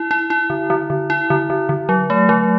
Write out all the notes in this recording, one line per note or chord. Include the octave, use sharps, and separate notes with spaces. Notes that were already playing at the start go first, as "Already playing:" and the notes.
Already playing: E4
E4
E4
D3
D3
D3
E4
D3
D3
D3
F#3
A3
F#3